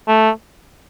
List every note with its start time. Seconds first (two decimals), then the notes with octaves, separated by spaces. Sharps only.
0.08 A3